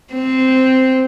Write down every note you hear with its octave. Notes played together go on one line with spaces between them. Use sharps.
C4